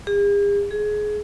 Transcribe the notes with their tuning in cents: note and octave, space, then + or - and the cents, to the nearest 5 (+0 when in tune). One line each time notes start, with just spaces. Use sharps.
G#4 -45
G#4 +20